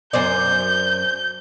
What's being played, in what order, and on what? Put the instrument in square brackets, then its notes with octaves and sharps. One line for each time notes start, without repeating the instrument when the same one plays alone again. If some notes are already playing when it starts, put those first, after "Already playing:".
[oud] F#2 C5 D5 [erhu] G6